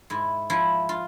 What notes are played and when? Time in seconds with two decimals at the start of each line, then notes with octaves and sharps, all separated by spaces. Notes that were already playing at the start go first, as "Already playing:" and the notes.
0.10 G#2 E4
0.50 F3 E4
0.89 F4